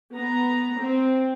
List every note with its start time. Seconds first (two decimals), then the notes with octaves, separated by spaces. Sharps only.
0.14 B3 A#5
0.79 C4